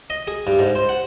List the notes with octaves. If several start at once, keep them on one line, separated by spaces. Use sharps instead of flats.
D#5
G#4
G2
G#2
C5
F#5